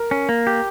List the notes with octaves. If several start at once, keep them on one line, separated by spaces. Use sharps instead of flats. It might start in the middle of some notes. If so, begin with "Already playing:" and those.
Already playing: A#4
C#4
A#3
G4